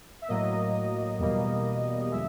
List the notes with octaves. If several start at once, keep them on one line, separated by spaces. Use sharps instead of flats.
E5
A2 F#3 A#3 D#5
E2 B2 G3 A#3
D3 F3 G#3 E5